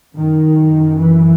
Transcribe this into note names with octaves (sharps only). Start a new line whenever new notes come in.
F#2 D#3
E3